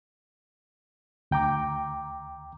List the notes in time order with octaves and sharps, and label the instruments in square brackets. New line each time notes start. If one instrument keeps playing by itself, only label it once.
[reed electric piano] D2 G5 A#5 D6